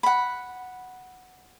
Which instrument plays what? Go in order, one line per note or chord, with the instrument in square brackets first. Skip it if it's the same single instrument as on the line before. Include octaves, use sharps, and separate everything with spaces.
[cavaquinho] F#5 B5